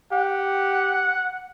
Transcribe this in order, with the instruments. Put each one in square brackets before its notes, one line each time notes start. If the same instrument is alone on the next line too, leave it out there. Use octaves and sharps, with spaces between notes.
[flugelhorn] G4 [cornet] F#5